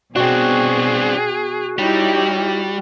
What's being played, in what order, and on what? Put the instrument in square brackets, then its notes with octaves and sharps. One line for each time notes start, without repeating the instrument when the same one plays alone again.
[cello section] B2 [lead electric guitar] C4 D4 [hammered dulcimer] F#4 G5 [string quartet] G#4
[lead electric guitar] G3 [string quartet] D#4 [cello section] E4 G4 C#5